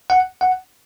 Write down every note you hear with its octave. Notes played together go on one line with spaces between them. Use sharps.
F#5
F#5